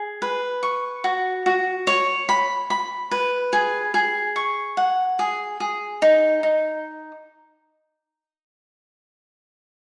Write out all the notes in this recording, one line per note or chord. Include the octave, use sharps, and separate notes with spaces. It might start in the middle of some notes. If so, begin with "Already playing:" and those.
Already playing: G#4
B4
C#6
F#4
F#4
C#5
B5
B5
B4
G#4
G#4
C#6
F#5
G#4
G#4
D#4
D#4